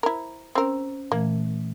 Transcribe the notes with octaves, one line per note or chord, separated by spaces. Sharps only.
E4 A#4 C5
C4 C#4 A#4 C5 E6
A#2 E3 A3 A#3